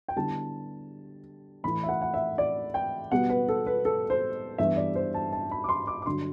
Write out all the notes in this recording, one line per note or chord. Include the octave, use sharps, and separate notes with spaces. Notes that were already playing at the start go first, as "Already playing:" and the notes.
G5
D3 G3 B3 E4 A5
A2 E3 A3 E4 B5
E5
F#5
F#5
E5
D5
G5
B2 G3 B3 F#5
B4
A4
B4
A4
C5
G2 E3 G3 B3 E5
D5
C5
A5
A5
B5
D6
C6
D6
D6
G2 D3 F#3 C6